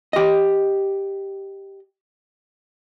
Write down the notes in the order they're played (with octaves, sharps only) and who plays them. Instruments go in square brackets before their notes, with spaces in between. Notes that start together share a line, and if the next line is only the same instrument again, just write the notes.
[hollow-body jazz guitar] G4 D#5